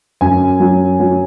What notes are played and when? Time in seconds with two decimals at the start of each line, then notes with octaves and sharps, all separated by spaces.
0.21 F#2 G#5
0.60 F#3
1.00 F#3